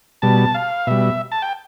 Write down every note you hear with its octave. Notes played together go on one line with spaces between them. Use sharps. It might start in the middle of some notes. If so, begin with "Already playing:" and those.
B2 G3 A5
F5
B2 G3 E5
A5
G5